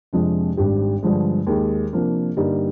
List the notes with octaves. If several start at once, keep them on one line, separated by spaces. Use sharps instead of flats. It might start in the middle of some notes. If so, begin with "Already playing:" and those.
F2 C3 F3 G#3 D4
G#1 G#2 G3 D4 G4
G2 D3 F3 G#3
D#2 D#3 G#3 D#4 G#4
C3 F3 A#3 D4
G2 D3 G3 A#3 D#4